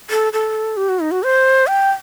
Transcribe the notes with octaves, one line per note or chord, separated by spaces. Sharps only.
A4
A4
G4
F#4
D#4
F#4
C5
G5